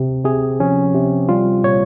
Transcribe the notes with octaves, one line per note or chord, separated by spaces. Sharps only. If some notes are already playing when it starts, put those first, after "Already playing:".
Already playing: C3
C3 G#4
F3 C#4
C3
G3 F4
A#2 C#5